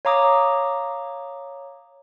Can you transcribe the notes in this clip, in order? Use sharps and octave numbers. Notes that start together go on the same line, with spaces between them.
C#5 F5 A#5 D6 D#6